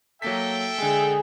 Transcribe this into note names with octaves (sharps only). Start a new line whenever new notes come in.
F#3 A#3 A4 E5 G5 B6
D3 G#3 G#4